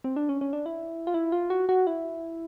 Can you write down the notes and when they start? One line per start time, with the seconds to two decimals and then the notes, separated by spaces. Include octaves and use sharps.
0.04 C4
0.16 D4
0.29 C#4
0.41 C#4
0.53 D4
0.66 E4
1.07 F4
1.14 E4
1.32 F4
1.50 F#4
1.69 F#4
1.87 E4